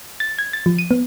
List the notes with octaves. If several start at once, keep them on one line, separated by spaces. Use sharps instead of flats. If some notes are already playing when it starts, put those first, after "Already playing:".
A6
G#6
A6
F3
D#7
B3